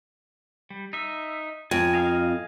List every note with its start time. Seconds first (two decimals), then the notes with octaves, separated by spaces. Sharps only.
0.70 G3
0.93 D#4 E5
1.71 F2 G#5
1.94 D#5 F5 G#5